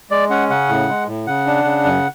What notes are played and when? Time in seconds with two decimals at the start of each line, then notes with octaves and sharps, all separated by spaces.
0.10 G#3 D5
0.30 C#4 F#5
0.50 C#3 F#5
0.69 A2
0.88 G#3
1.07 A2
1.27 C#3 F#5
1.46 D4
1.65 C#3
1.84 F#2